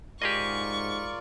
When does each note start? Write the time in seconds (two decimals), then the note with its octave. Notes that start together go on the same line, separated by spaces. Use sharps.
0.22 G#2 F4 G4 G#4 A#4 D5 D#5 C#6